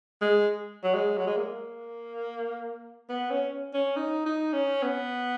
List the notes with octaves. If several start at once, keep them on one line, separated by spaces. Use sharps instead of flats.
G#3
F#3
G#3
F#3
G#3
A#3
B3
C#4
C#4
D#4
D#4
C#4
B3